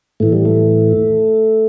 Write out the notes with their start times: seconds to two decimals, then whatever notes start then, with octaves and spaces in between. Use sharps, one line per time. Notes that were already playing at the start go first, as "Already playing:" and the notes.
0.20 A2 E3 A3
0.32 G3
0.45 A3